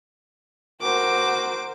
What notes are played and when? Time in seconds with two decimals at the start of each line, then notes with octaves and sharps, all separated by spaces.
0.82 F#4 A#4 C5 D6